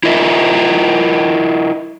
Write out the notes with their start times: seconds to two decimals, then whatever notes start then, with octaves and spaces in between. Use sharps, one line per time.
0.03 E4 F4 A#4 D#5 E5